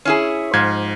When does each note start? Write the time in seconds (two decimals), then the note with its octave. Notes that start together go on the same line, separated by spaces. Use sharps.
0.05 C#4 E4 G#4
0.53 G#2 F3 G#6